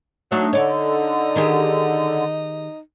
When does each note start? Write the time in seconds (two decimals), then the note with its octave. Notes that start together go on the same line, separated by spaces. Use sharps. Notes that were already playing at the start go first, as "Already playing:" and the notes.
0.32 F#3 A3 D4 D#4
0.53 D3 D#4 C#5 D5
1.36 D#3 G4 G#4